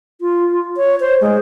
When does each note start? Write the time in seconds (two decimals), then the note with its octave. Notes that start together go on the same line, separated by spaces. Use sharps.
0.21 F4
0.77 C#5
1.00 C5
1.21 G#3